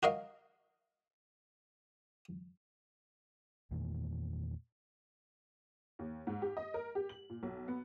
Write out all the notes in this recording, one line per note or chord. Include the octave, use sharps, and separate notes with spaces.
F#4 A#4 D#5 F5
E2 A#2 D#3 A3
D#2
G#2
G4
D#5
A#4
G4
F#7
A#2
B1
B3